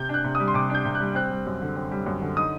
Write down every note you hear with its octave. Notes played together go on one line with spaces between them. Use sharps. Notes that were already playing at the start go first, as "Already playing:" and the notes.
Already playing: C3 G6
D4 F#6
C3
D#6
G3
C6
C3 D6
D4 G6
C3
F#6
G3
C4 F#6
G3
F#2
D3
C4
G3
F#2
D3
D#4 D#6